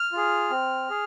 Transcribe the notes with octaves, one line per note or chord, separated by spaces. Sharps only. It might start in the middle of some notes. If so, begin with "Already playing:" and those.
Already playing: F6
F4 G#4
C4
G#4